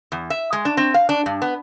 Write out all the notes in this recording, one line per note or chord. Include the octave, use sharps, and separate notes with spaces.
E2
E5
G#3
D4
C4
F5
D4
G2
B3